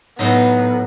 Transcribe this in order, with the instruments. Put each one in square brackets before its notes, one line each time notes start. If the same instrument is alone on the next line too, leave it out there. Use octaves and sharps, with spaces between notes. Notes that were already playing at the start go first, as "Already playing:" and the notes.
[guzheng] A2 F#3 D#4 [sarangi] B3